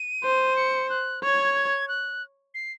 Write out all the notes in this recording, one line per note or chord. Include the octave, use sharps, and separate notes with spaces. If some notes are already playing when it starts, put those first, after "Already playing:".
Already playing: D#7
C5
C#7
F#6
C#5 G#6
G#6
F#6
C7